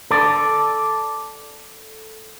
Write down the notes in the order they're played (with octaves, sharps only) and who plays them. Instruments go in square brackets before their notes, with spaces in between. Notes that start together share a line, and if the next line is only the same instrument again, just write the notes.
[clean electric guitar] A4 D5